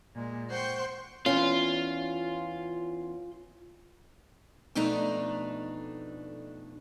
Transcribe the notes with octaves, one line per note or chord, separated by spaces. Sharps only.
A#2 G#3
C5 F#5 G5 C6 C#6 G6
E2 C#4 F4
F2 B2 A3 D4 D#4 A#5